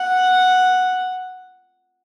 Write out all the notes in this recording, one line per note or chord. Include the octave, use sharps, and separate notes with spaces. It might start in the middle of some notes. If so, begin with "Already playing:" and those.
Already playing: F#5